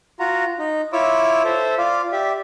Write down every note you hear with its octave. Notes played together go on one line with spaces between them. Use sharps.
F4 F#4 A#5
D#4
E4 F4 C#5 D6 E6
A4 C5 E5
F4 D5 F5
G4 D5 E5